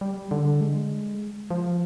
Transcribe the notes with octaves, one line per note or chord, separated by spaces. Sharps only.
G3
D3
G#3
F3